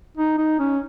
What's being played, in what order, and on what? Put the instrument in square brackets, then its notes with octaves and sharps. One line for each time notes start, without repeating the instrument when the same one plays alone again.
[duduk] D#4
D#4
C#4